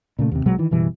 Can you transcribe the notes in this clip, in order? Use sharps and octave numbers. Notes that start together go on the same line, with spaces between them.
A#2 C#3 A3
D#2 C3
A#1 B2 F#3 G#3
D#3 E3
F#1 B2 E3 G3